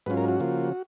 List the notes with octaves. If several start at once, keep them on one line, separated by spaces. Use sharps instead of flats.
G#2 F#3 C#4 F4 B4
A#4
F#4
C#3 F3 A#3 F4